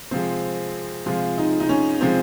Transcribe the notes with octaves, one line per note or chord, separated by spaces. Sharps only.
C3 F3 G#3 C4
C3 F3 G#3 F4
D#4
D#4
C#4
C3 F3 G#3 C4